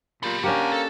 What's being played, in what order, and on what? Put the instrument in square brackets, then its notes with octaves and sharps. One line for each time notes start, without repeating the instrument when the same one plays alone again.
[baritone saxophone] A#2 [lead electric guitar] B3 G4
[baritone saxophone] A#3 [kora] C#4 D4 G4 [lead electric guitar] F#5 A5
[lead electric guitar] A4